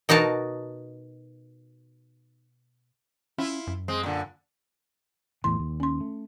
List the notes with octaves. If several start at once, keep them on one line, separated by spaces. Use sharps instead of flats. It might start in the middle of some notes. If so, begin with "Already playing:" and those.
B2 D#4 F#4 A#4 A5
C#4 E4 F4
F#2
G#3 C4
A#2 D3
E2 A2 E3 C6
D#2
C#4 C6
A3